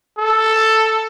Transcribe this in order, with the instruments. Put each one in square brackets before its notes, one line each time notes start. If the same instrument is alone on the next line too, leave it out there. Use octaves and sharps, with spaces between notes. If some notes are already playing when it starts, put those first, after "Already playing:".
[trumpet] A4